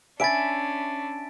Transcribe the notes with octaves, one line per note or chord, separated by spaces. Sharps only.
C#4 D4 E5 G#5 B5 A6 D7